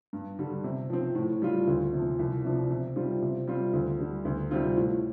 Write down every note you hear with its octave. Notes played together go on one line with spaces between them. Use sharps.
G2
D3 G3
C3
F3 C4
A2
G3 F4
D2
C3 F3
C2
C3 F3 D4
C3
G3 C4 F4
C3
G3 C4 F4
D2
D3 G3
D2
C3 G3 C4 F4
A2